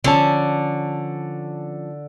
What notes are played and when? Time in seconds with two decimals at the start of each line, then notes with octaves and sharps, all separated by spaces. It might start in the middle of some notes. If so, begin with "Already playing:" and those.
0.04 D3 F3 C#4 A5